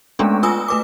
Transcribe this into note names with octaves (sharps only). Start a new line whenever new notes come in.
G#3 A3 B3 C#4 D4 A4
F4 B4 G#5 D#6 E6
A3 B4 D6